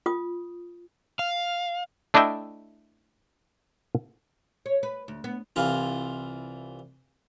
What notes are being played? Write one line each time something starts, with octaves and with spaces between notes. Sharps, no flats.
F4 D#6
F5
A3 D4 E4 D#5 E5 G5
C#5
B4
D2
B3
C2 E3 F4